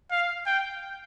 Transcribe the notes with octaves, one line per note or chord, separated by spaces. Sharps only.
F5
G5